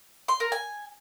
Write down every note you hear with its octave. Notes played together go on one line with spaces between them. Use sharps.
C6
A#4
G#5